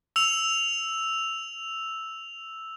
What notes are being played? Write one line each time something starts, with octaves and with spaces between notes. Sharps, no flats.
E6 F7